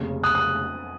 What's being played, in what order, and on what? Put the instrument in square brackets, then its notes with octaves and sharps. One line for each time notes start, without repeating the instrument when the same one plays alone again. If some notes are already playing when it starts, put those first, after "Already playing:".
Already playing: [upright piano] F1 D#2 C#3
[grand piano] D#6 F#6
D#6 F#6